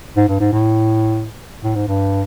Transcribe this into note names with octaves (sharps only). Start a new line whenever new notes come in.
G#2
G2
G#2
A2
A2
G#2
G2